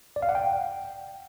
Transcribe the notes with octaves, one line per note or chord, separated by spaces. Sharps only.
D5
F5
F#5
G5